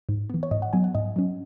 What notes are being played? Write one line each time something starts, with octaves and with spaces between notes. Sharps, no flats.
G#2
E3 B3
C#5
G#2 D#5
F#5
F#3 B3 G#5
F#5
G#2 D#5
F#3 C#4